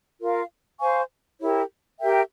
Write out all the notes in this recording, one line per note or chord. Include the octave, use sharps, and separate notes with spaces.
F4 A#4 F5
C5 F5 G#5 C#6
E4 G4 A#4 C#5
G4 A#4 E5 G5